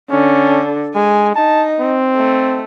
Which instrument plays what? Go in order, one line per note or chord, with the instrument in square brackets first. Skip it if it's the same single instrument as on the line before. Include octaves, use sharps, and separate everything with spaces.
[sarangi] D3 [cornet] C#4
[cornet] G#3 [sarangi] G#5
[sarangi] D#4 [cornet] A5
[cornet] C4
[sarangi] A3